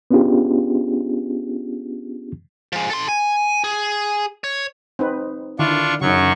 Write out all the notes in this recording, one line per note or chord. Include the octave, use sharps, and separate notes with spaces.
B3 C#4 D4 F4 G4 G#4
F3 G#3
A4 C6
G#5
G#4
C#5
C4 D#4 B4
D3 D#3 D4 E4 F4 C#6
F#2 C#3 F#3 D#4 C#6